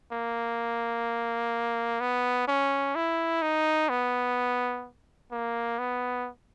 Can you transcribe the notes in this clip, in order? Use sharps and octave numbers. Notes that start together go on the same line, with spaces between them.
A#3
B3
C#4
E4
D#4
B3
A#3
B3